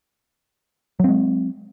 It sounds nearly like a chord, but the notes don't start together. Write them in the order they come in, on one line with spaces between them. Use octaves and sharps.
F#3 C4 G#3